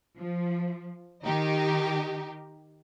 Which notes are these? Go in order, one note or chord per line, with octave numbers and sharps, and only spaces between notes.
F3
D#3 D#4 G4